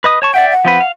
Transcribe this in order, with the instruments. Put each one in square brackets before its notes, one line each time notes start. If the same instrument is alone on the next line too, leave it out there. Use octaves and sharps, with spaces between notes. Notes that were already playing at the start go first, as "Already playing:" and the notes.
[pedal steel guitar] B4 D#5 D#6
C#5 A5 C#6
[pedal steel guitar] D5 E5 G5 [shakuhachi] F#5
[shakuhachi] F#5
[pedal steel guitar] F3 C4 B4
F5